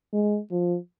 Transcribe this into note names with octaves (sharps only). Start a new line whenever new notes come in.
G#3
F3